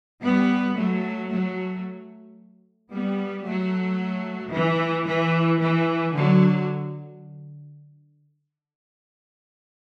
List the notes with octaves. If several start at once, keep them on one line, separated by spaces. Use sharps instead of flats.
G3 B3
F#3 A3
F#3 A3
G3 B3
F#3 A3
E3
E3
E3
D3 F#3